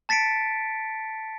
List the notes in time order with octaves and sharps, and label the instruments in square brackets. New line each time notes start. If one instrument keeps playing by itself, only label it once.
[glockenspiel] A5 A6 B6 C#7 D7